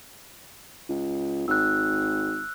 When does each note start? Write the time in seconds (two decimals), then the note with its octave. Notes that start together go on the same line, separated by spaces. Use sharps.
0.89 C#2
1.48 G#1 E6 F#6